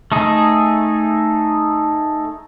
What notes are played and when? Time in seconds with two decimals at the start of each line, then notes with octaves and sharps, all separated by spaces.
0.12 A3 D#4 G#4